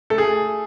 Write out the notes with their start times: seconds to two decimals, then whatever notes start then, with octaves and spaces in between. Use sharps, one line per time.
0.10 A3 A4
0.18 G#4